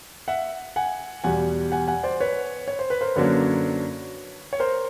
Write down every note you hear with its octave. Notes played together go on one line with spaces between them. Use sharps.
E5 F#5
F#5 G#5
E2 B2 G3 F#5 G#5
F#5 G#5
F#5 G#5
C5 D5
B4 C#5
C#5
C5
B4
A#4 C5
F#2 D3 F#3 A#3 D4 B4 C#5
C#5
A#4 C5